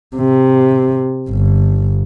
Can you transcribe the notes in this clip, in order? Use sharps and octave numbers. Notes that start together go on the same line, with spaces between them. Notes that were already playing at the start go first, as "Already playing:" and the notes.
C3
G1